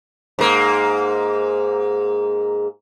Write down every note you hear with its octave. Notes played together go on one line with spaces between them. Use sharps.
G#2 A#3